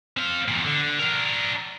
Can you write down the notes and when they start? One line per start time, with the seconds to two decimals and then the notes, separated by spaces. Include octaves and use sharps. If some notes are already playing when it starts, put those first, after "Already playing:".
0.17 C4 F5
0.48 E2 A#2
0.65 D3
0.99 D4 A#4